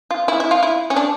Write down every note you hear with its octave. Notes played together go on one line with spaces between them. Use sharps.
F4
E4
E4
F4
E4
C#4
D4